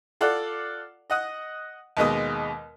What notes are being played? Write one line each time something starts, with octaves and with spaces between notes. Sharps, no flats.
F4 A4 D5 F#5
D#5 F#5 D#6
D#2 B2 G#3 D#6